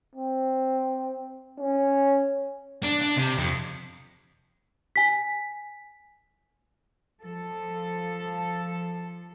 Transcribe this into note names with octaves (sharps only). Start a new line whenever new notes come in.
C4
C#4
D4
D4
C3
F2
G#5 B6
F3 A4